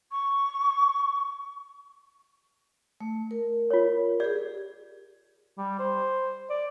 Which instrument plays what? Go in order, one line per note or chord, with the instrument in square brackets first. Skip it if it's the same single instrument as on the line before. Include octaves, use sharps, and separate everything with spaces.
[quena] C#6
[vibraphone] A3
A#4
[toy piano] F4 C#5
[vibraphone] G4 G#4 [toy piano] D5
[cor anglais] G3
C5
D5